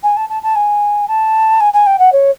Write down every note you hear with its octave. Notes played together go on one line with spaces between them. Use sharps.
G#5
A5
A5
A5
G#5
A5
G#5
G#5
G5
F#5
C#5